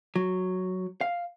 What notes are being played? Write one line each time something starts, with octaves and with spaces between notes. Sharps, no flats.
F#3
F5